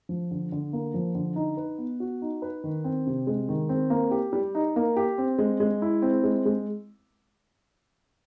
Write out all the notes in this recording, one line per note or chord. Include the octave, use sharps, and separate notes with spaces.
F3
D3
D3
A#3
F3
D3
D#4
B4
B3
F#4
D#4
B4
D#3
C4
C3
G#3
D#3
C4
A#3
G4
G3
D#4
A#3
G4
C4
G#3
G#3
E4
C4
G#3
G#3